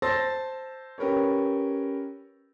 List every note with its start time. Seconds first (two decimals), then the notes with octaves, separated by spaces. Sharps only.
0.02 C5 A5 C6 E6 A6 A#6
0.98 C#4 G4 A#4 B4 C#5